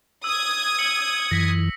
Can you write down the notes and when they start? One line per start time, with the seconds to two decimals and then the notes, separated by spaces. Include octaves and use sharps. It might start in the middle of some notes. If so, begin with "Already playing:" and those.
0.24 D#6 E6 G#6
0.79 C#7 F#7
1.31 F#2 E3 A#6 B6